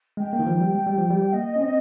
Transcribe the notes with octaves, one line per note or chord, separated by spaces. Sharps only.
G#3 G5
A#3
D#3
F3
G3
G#3
G3
F3
G3
A#3 D#5
C#4
C4